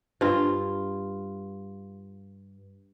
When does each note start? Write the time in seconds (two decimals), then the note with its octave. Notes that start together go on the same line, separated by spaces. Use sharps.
0.21 G2 F4